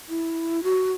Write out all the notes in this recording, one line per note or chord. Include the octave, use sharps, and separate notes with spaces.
E4
F#4